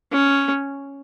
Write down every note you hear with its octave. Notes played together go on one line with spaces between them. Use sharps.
C#4